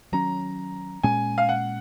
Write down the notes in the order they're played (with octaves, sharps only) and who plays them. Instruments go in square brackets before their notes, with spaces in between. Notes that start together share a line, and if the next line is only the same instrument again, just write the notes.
[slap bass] D#3 F#3 C#4 [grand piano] A#5
[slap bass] A#2 G#3 C#4 [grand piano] G#5
[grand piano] F5
F#5